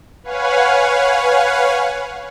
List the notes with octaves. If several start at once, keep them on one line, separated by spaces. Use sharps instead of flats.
B4 C#5 F5 F#5 G#5